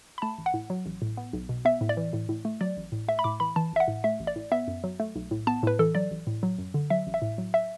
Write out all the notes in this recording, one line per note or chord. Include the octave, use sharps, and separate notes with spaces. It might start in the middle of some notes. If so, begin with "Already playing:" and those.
B5
A3 A5
A1
F#5
A2
F#3
A1
A2
B3
B1
B2
B3 E5
A2
D5
E3
A2
A2
A3
F#3 D5
A1
A2
A3 E5
B5
A2 D6
E3 B5
E3 A5
A1 E5
F#5
A2
A3 E5
A1
D5
A2
B3 E5
F#2
F#3
A3
B1
A2
B3 A5
A2 B4
E3 A4
F#3 D5
A1
A2
F#3
F#2
D3
F#3 E5
A1
E5
A2
F#3
E5